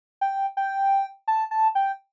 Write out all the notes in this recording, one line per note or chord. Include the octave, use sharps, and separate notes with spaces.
G5
G5
A5
A5
G5